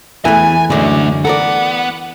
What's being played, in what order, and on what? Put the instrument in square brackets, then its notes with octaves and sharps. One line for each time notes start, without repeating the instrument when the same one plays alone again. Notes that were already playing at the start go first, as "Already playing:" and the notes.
[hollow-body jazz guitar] E2 A3 [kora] E3 [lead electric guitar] G#5
[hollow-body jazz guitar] F#2 D3 G#3 [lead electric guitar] A3 D4
[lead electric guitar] B3 F#5 [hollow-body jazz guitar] A4 A#4 D5